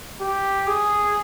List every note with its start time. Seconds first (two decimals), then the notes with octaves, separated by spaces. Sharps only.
0.20 G4
0.67 G#4